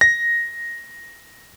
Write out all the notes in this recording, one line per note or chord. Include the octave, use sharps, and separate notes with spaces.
A#6